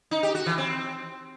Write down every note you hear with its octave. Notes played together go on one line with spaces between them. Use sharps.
D#4
G4
F#4
E3
C4